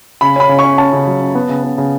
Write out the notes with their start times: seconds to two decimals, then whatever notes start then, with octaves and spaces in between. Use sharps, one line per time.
0.21 C#3 B5
0.36 C#4 B5
0.49 C#3
0.59 C#6
0.64 C#4
0.78 C#4 A5
0.93 C#3
1.07 F#3
1.21 C#4
1.35 B3
1.49 C#3
1.64 B3
1.78 C#3